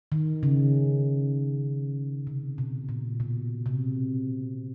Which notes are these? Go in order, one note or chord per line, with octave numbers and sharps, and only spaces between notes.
D#3
C#3
C3
B2
A#2
B2
C3